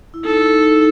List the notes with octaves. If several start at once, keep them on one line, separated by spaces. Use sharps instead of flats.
E4
D#4 A4
D#4
D#4